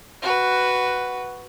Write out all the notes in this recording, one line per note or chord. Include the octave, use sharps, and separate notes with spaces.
F#4 B4